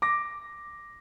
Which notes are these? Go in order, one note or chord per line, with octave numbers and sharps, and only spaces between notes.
D6 A#6